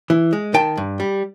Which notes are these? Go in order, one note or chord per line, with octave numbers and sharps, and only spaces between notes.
E3
G#3
D#3 G5 A5
G2
G3